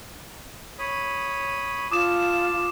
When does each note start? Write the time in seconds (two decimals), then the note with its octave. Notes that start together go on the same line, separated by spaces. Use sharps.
0.79 C#5 B5 D#6
1.91 F4 A5 D6 D#6 E7